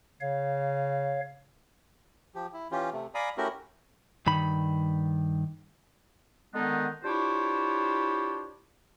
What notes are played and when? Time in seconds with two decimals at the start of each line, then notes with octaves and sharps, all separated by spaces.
0.21 C#3 C#5 F5
2.35 F3 G4
2.53 E4
2.71 E3 C#4 F4 G4
2.93 C3 A3
3.15 D5 F5 G#5 A#5 B5 D#6
3.37 A3 C#4 E4 F#4 G4 A#4
4.27 G2 D#3 B5
6.54 D3 D#3 G#3 B3 D4 D#4
7.03 D4 E4 F4 G4 C5 C#5